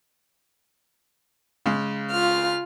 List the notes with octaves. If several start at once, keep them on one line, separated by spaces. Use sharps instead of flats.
C#3 G#3
F4 F6